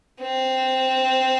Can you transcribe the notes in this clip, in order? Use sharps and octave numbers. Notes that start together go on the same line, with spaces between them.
C4